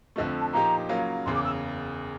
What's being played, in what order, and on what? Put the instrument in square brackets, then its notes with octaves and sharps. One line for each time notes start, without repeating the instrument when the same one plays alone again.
[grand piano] F2 D3 F3 A3 [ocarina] D#5
[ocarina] A5
[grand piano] A#2 F3 A#3 D#4 G4 [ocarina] A#5
[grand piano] C#3 F#3 A#3 C#4 F4
[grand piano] F#1 E2 C#3 [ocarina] C6
[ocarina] D6
E6